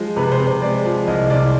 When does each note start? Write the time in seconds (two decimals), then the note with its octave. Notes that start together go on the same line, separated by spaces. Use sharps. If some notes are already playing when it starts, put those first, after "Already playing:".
Already playing: F3 G#3 C5
0.17 C3 B4
0.32 C5
0.40 C3
0.47 C5
0.62 G#3 D5
0.85 F3
1.07 C2 D#5
1.30 C2 D5